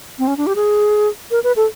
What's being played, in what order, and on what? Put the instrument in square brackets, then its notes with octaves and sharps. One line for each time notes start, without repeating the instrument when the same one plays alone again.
[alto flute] C4
C#4
D4
G4
G#4
A#4
B4
A4